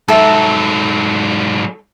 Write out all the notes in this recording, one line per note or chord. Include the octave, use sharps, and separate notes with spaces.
G#2 F#3 A4 E5